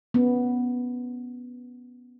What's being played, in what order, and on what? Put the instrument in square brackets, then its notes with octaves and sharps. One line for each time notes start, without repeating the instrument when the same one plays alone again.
[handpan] B3 C#4